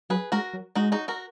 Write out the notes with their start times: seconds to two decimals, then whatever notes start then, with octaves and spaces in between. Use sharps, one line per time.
0.10 F#3 G#4 B4
0.32 G#3 F#4 A#4
0.54 F#3
0.75 G#3 D#4 F#4
0.92 D#4 F#4
1.08 F#4 A#4